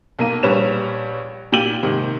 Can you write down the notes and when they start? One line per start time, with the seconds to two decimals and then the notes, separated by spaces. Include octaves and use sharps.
0.19 B1 A#3 D#7
0.43 A#1 G3 B4 C#5 E7 F7
1.52 A#2 G4 G5 D#7 F#7
1.83 G#2 C3 D#3